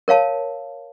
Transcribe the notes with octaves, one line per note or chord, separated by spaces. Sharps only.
A#4 C#5 F5 A5